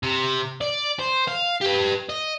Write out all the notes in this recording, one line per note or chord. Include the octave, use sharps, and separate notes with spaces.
C3
D5
C5
F5
G4 B4
D#5